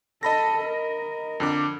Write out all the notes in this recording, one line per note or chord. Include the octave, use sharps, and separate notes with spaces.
A4 D#5 B5 A#6
A#4
F2 D3 D6